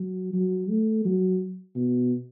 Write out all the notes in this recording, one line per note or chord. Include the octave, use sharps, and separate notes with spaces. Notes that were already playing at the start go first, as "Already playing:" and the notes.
Already playing: F#3
F#3
A3
F#3
B2